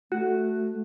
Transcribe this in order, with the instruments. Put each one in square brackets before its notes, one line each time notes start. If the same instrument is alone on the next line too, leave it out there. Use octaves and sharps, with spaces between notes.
[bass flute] A3 [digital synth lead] F#4